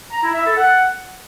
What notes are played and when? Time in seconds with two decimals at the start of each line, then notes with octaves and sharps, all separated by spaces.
0.12 A#5
0.23 E4
0.34 E5
0.46 A4
0.57 F#5